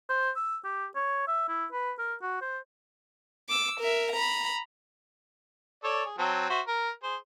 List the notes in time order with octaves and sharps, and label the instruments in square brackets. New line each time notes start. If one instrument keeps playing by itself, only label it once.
[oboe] C5
E6
G4
C#5
E5
E4
B4
A#4
F#4
C5
[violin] D6 E6
A#4 E5
A#5 B5
[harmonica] A4 C#5 D5
G#4
F#3 C4 A5
F#4 C5 E5
A#4
G#4 C5